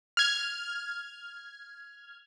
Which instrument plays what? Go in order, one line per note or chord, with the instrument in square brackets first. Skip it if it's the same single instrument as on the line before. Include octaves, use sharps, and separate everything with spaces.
[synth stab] F6 G#6